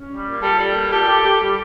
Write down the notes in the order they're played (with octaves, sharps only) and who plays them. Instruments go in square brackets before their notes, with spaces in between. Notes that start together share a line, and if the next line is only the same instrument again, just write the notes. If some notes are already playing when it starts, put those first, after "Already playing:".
Already playing: [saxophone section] C#4
G3
A#2
[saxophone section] G3 [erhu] A4
[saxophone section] G3
A#2
[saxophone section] G4 [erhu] A4
[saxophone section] G4
G4
G3